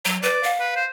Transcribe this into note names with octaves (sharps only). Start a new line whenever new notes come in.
F#3
B4 D5
F5
B4
C5